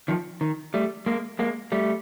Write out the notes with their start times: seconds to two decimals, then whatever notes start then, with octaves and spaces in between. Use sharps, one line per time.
0.08 D#3 F3
0.41 D#3
0.74 G3 A3
1.06 G#3 A#3
1.39 G#3 A#3
1.72 G3 A3